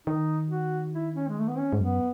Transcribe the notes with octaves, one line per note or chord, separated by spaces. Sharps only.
D#3 D#4
F#4
E4
C#4
G#3
A3
B3
C#4
G#2
F#2 B3